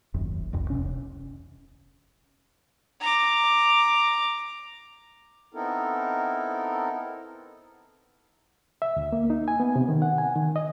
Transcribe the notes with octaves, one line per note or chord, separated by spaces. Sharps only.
D#1 G#1 F#2
F1 C2 F2
E1 A#1 C3 C#4
A#5 D6
B3 C4 D#4 E4 A4 A#4
E5
D2
A#3
D#4
G#5
B3
C3
D#3
F#5
G#5
D#3
D#5